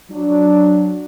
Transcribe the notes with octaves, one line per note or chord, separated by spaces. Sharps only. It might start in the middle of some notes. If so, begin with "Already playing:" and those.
F#3 D4